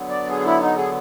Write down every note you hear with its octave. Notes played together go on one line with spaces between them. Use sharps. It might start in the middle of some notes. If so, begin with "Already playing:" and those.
Already playing: D3 F#3 B3
D5
G#4
E4
D#4
G#4